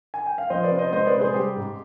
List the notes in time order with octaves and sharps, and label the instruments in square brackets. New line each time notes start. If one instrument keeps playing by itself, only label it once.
[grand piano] G#5
G5
F5
F3 C5 D#5
B4 D5
C3
C5 D#5
G#3 C5 D#5
B4 D5
C3
G#4 C5
G3 G4
G#2